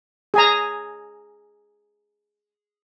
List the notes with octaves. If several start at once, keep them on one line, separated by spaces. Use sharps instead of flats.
G#4 G#5 A#5